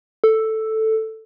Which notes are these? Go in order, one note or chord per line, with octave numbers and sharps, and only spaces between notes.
A4